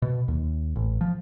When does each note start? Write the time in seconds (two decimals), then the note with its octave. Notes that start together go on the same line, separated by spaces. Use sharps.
0.02 B2
0.28 D#2
0.76 A1
1.01 F3